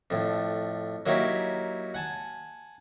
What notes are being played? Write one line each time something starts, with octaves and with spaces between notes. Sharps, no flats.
F2 A2
F#3 A#3 D#4 E4 G4 C#5
F#5 G#5 A5